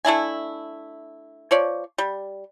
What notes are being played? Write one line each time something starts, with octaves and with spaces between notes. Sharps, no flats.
A3 D4 E4 G#5
F3 C#5 D5
G3